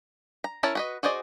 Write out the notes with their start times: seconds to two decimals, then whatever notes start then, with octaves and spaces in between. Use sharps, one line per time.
0.44 A#5
0.63 C#4 E4 A#4 C#5 A5
0.75 F#4 B4 D#5
1.03 F#4 G#4 C5 D5 D#5